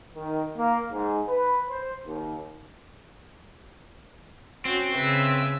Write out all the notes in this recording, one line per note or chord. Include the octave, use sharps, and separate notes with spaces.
D#3
A#3
G#2
B4
C5
D#2
C4 C#4 F#4
C#3 B4 E5 E6